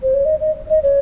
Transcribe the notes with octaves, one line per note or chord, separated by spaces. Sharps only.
C5
C#5
D#5
D#5
D#5
C#5